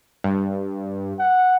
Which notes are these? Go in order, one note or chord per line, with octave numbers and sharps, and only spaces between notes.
G2
F#5